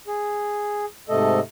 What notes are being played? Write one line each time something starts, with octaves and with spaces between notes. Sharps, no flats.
G#4
G#2 C3 A3 A4 D#5